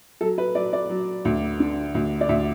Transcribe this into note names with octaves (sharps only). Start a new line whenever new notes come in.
F#3 A4
B4
F#3 D5
D5
F#3
D2
D3
D2
D5
D2 E5